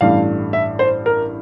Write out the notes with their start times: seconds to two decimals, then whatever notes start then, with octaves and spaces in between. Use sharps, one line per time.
0.01 A1 G2 E3 A3 F5
0.53 E5
0.79 C5
1.06 A#4